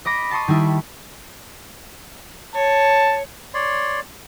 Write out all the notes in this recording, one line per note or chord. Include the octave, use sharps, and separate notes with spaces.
D#5 B5 D6 A#6
A5 C6 C#6 D#6
D#3 G3 E4
C#5 A5
C#5 D5 C6